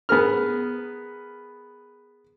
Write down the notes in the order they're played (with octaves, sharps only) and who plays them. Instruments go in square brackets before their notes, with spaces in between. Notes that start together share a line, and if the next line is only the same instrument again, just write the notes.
[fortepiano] B3 G#4 A#4 F6